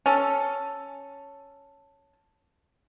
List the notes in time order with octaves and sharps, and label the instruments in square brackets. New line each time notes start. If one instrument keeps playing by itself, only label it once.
[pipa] C#4 A4